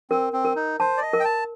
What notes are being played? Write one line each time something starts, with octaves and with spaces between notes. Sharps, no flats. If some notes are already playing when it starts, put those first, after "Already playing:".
C4 A#4
C4
A#4
D#4
C5 A5
D5
D#5
A#4
G5
A5